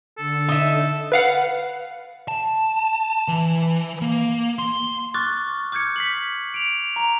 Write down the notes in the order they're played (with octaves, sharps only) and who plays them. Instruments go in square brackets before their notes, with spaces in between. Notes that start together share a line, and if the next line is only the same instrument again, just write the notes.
[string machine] D3 [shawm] A4
[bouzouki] D#4 E5
[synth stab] B4 F5 F#5
[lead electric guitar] A5
E3
A#3
C6
[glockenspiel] C#6 D6 F6 F#6 A6
D6 F6 G6 G#6 C#7
B6 C7 F#7
D7 F7
A#5 F7